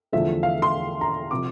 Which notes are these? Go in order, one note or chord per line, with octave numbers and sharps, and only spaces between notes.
E2 D3 F3 A3 E5
F5
C6
A#5
C3 F3 D6